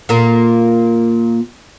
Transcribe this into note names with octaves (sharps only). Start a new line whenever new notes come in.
A#2 A#3